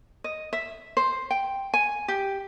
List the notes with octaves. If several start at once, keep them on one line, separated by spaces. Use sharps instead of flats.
D#5
E5
C5
G5
G#5
G4